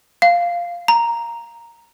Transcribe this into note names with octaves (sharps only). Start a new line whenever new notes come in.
F5
A#5